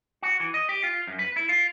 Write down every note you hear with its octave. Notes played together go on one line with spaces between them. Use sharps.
F#4
E3
D#5
G4
F4
F#2
B4
E4
F4